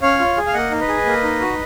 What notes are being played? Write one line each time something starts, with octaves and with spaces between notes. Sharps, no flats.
C#4 C#5 F5
F4
G#4
F5
A#3 D#5 F#5
D#4
B4 D#5
G#4
A#3
D#4
F#4